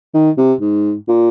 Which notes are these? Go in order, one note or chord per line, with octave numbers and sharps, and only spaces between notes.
D#3
C3
G#2
A#2